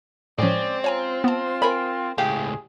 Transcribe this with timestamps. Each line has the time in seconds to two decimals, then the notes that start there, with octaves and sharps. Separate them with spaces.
0.38 A2 F3 G#3 C4 C#4 D5
0.84 F4 C#5 G#5 A#5
1.24 B3 F4 A5
1.62 A#4 G#5 B5
2.18 C#2 A2 G4 G#4 F5